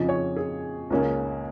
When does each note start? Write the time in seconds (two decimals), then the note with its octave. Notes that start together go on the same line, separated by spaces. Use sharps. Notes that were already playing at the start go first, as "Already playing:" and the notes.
Already playing: F2 C#3 F3 D#5
0.09 C#5
0.36 G#4
0.90 C#2 C#3 A#3 C#4